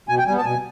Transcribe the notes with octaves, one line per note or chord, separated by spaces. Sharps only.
B2 G#5
G5
G3 B3 G#5
A5
B2 G#5